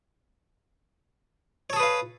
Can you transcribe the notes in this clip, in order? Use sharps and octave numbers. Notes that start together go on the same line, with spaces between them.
G#4 A4 B4 C#5 F5